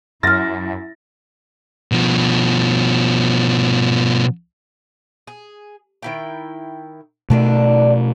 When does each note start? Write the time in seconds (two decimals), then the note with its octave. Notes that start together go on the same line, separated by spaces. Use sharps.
0.23 F#2 E4 C6 F6 A6 A#6
1.92 B2 F3
5.27 G#4
6.03 D#3 E4 G5
7.30 B2 D3 D#3 A3 D4